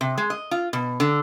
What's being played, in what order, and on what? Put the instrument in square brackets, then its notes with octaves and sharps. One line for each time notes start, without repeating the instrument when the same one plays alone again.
[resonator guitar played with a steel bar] C3
G#3
D#5
F4
B2
D3